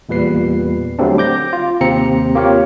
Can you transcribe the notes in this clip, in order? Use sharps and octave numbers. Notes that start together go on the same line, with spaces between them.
E2 A#2 G3 B4 C7
D3 F#3 G3 A3 C4 D4
D6 G6 A#6
F4
D#2 C3 C4 A#5 C#7
A#3 F4 G4 A#4 C#5